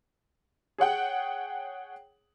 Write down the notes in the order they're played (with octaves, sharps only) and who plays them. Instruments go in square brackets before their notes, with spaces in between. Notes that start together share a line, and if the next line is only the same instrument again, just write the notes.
[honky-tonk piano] G#4 C#5 F#5 G5